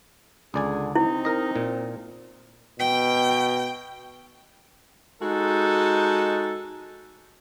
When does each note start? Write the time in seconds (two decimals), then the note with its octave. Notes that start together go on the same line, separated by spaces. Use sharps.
0.54 C#2 D3 G#4 D5 G#5
0.96 C4 D#4 E4
1.25 A#4 D#5
1.56 A#2
2.80 B2 G5
5.22 G#3 D#4 F#4 A4